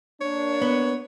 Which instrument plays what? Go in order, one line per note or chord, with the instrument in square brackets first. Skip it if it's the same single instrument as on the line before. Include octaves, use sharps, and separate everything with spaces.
[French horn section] A#3 D4 [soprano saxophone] C#5
[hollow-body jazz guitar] B3